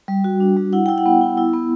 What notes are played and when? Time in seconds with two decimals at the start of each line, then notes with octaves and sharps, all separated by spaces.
0.08 G3
0.24 F#4
0.40 D4
0.56 G3
0.73 E4 F#5
0.86 E4 G5
0.98 F#5
1.06 B3
1.21 E4
1.37 E4
1.54 B3